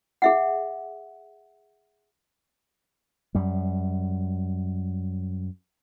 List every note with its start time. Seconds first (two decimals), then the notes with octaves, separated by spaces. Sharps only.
0.22 G#4 E5 F#5
3.35 F#2 G3